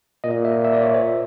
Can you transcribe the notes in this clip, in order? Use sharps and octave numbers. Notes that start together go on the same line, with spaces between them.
A#2 D#5
E5
E5
D5
C#5
C5